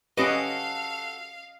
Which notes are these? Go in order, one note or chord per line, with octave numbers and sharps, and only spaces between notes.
C#4 F#4 G4 A4 B4 D#5 F5 D6